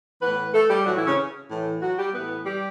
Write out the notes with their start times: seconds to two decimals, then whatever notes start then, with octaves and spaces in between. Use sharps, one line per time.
0.22 A2 E3 B3 B4
0.54 A3 A4
0.70 G3 G4
0.86 A2 E3 F#3 F#4
0.97 E3 E4
1.07 C#3 C#4
1.50 A2 E3
1.82 F#3 F#4
1.99 G3 G4
2.14 A2 E3 B3 B4
2.46 G3 G4